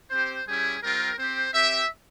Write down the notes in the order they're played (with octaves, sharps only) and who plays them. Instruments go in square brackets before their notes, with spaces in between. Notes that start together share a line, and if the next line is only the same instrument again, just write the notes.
[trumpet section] C4 G4 C5
G3 C#4 E4 G4 G#4
G3 C4 F4 A#4
C4 G4 C5
C4 G4 E5